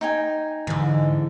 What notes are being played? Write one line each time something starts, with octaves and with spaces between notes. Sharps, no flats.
D#4 G5 G#5
G#2 D3 E3